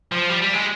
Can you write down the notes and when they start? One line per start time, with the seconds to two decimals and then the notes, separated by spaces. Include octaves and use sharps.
0.12 F3
0.30 G3
0.42 G3
0.54 G#3